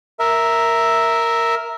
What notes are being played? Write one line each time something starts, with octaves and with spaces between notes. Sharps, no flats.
A#4 E5